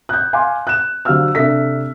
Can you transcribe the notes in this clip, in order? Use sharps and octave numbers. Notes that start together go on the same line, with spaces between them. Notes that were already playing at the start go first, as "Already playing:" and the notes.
F#6 G6
F5 G#5 C6 D6
F#6 E7
D3 F#3 C4 F5 E6 F6
C3 D4 A4 E5 B6